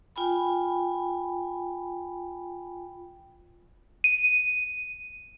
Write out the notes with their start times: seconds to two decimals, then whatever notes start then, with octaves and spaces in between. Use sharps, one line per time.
0.16 F4 G5 G#5 B5
4.04 D#7